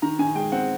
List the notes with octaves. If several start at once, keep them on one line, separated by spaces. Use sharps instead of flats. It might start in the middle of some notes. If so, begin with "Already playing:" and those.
D#3 A#5
D#3 G#5
G#3 G5
C4 F#5